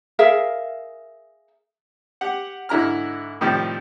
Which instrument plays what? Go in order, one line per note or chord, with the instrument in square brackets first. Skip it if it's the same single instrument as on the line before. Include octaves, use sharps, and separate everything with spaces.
[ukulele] G#4 A#4 E5 F5
[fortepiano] G4 F#5
G#2 D3 E4 A#5 F6
A2 C3 D#3 F3 G3